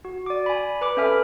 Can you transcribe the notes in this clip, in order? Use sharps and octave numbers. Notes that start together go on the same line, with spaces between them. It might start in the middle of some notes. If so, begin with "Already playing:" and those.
F#4
D5 D6
G#5 B5
B4 B5 D6
C#4 A4 E5 G#5 B5 F6